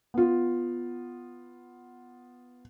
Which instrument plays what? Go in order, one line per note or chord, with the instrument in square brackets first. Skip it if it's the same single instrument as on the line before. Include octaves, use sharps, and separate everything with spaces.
[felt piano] B3 F4